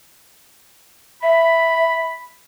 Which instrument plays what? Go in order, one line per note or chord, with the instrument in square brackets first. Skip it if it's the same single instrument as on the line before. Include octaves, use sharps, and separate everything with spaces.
[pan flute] E5 [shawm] B5